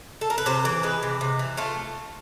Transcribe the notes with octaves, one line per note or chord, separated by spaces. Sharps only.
A4
A#4
B4
C3 C5
E3
G#3 B4
C3
C3
E3
A3 F4